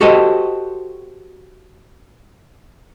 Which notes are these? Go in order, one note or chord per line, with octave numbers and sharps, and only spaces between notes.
F#4 G4 A4 C5 D#5